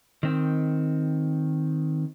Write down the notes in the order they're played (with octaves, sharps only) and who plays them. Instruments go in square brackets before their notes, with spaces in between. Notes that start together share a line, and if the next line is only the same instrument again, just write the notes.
[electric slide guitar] D#3 C4